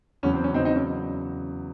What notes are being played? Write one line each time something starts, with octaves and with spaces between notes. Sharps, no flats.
E2 C#3 F#3 C#4
C4
C#4
E2 C#3 F#3 C4 D#4
C4 D#4
C#4